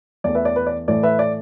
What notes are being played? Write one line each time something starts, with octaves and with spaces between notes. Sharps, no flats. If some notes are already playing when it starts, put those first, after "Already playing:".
E2 E3 A3 D5
B4 E5
D5
B4
D5
A2 E3 A3 D5
B4 E5
D5